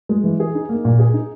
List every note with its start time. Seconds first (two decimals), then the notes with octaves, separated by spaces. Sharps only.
0.09 G#3
0.24 E3
0.40 G#4
0.55 D#4
0.69 A#3
0.85 A#2
0.99 G#4
1.14 D#4